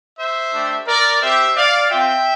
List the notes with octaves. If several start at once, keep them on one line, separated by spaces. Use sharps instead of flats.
C5 E5
A3 D4 G4
A#4 D5
C4 G4 C5 E5
D5 F5
C4 F4 E5 G5